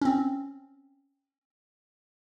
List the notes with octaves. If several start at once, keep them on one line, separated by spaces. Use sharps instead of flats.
C4 C#4